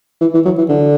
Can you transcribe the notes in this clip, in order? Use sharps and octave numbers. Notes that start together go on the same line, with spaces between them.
E3
E3
F#3
E3
D3